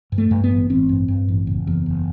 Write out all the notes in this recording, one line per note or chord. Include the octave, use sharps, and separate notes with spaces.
G2
A3
G2
B3
A1
A1 C4
G2
G2
A1
F#1
E2
F#1